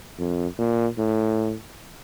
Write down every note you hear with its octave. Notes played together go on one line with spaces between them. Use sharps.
F2
A#2
A2